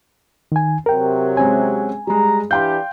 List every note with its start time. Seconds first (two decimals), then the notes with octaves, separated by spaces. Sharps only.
0.52 D#3 G#5
0.86 C3 F#3 A#4 G5
1.37 G#3 C4 C#4 G#5
2.07 G3 G#3 A#5
2.51 E3 D4 G4 F5 G5 C6 G6